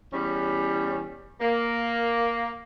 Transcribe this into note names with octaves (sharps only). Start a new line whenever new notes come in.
E2 G3 C#4
A#3